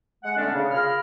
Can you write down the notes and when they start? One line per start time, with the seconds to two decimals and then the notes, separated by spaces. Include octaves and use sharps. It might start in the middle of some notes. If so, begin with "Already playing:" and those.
0.24 G#3 F#5
0.37 D3 A3 B3 C#4 D4
0.53 C#3
0.72 F4 G#4 A#4 B5 F6